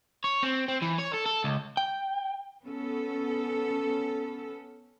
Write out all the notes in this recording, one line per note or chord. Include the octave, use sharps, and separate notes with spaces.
C#5
C4
C4
E3
C#5
A4
A4
C#2
G5
B3 C#4 A4